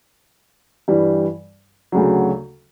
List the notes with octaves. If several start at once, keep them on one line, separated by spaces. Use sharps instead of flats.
G2 E3 G3
D2 C#3 F#3